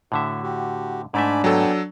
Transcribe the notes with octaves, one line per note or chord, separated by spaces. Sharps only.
A2 D3 F#4 E5
F#4 G4
G#2 A3 D4 E5 G#5 B5 D6
F#3 B3 A4 G5 G#5